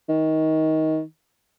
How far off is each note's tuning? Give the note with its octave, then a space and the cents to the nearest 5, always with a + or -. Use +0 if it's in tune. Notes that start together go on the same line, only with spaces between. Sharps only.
D#3 +20